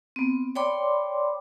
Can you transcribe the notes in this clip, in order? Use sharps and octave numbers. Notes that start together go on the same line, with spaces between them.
B3 C4
C#5 D5 G5 B5 C6 D6